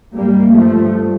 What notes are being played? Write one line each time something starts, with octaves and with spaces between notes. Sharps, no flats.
G2 G3 A#3
F3 A3